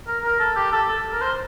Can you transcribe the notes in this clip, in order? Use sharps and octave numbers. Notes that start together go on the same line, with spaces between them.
A#4
A#4
A4
G4
A4
A4
A#4
C5